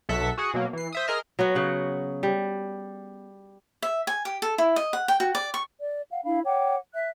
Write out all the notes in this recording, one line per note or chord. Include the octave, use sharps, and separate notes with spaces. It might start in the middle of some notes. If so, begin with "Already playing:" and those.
B1 F#3 A4 E5 F#5 B6
F#4 G#4 F#5
B2 F#3 A#3
E3 C7
C5 E5 D#6
G#4 A#4 D#5 F6
F#3 B3 F#4
C#3 F#5
G3
E5
G#5
G4
A4
E4
D#5
F#5
G5
F#4
D5
C#6
D5
F5 F#5
D4 E4 F5 B5
C#5 F#5 G5 D6
E5 F#6